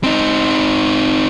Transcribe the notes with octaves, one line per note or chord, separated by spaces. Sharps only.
C4 D#4